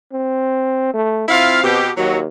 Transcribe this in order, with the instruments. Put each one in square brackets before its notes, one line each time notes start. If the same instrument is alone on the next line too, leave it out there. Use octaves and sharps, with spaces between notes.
[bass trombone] C4
A3
[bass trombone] C4 [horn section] E4 F4 F5
[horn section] B2 G4
[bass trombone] D#2 [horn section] F#3